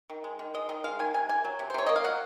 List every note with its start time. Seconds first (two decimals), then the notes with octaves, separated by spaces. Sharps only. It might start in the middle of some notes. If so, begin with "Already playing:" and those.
0.10 D#3
0.24 G#3
0.39 D#3
0.54 G#3 D#5
0.69 D#3 D#5
0.84 G#3 F5
0.99 D#3 G#5
1.14 C3 G#5
1.29 A#3 G#5
1.44 F#3
1.59 C3
1.70 C5
1.74 C3 C#5
1.86 A#3 D#5
1.96 F5
2.04 F#3 F#5